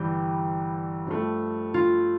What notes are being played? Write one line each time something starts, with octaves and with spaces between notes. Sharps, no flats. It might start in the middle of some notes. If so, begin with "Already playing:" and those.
Already playing: G1 G2 E3 G3 G4
G2 F3 A3
F4